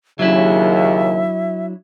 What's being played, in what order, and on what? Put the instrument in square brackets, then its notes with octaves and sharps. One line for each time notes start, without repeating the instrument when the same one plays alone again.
[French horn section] D#2 C#3 [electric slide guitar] F#3 D4 E4 [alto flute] E5